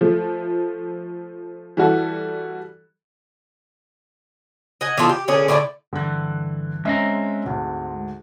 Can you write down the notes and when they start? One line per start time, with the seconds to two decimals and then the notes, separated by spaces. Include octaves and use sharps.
0.01 F3 A3
1.77 E3 G3 F#4 A4
4.81 D#5 F#5 G#5
4.98 E3 B3 F4 A4
5.09 G4
5.28 A#2 D3 C#4 G#4
5.48 A2 D3 A3 D5
5.93 G2 D3 E3 F#6
6.85 G#3 C4 C#4 D#5 E5 A#5
7.44 D2 G#2